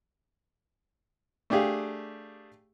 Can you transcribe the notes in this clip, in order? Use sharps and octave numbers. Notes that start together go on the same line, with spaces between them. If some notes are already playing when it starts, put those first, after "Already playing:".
A3 D4 G4 G#4 F5